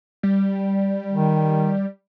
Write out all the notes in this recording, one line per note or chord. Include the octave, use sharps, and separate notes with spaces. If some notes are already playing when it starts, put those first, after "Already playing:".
G3
D#3